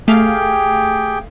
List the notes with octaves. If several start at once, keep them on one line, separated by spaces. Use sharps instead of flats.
A3 G4 G#4 F5 G5